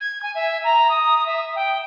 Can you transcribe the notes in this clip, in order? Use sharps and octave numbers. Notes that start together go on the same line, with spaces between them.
G#6
G#5
E5
A#5
D#6
E5
G5